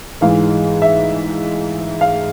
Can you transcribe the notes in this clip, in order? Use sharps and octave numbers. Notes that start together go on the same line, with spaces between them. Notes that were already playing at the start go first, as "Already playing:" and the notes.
G#2 E3 G#3 F5
E5
F5